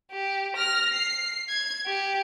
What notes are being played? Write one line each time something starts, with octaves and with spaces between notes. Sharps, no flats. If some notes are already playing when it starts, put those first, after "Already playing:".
G4
F6 A#6
C7
G#6
G4